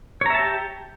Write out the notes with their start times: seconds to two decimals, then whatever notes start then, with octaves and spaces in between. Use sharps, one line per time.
0.21 C#5
0.26 A#5
0.30 E5
0.35 A5
0.39 G4